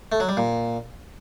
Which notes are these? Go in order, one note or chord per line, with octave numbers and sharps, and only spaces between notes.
A3
F#3
G3
A#2